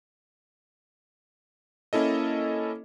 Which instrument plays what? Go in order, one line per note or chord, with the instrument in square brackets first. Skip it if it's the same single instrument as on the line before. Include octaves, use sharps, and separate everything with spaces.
[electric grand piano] A#3 C#4 E4 A4 D#5